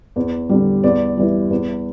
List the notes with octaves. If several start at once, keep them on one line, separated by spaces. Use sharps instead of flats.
E2
D3 G3
E2 D5
E3 G3
E2